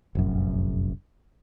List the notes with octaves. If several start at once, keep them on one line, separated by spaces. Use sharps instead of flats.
F1 A#1 F#2